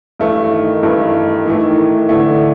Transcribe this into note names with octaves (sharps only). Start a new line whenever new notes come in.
G2 E3 A3
D#3
G2 E3 A3
A2 E3 A3
A2 D3 E3 A3